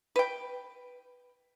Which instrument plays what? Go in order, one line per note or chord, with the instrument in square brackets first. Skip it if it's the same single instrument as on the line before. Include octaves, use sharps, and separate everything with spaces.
[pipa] B4 G5